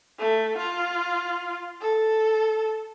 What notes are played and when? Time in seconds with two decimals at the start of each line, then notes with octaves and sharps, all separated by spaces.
0.18 A3
0.58 F4
1.81 A4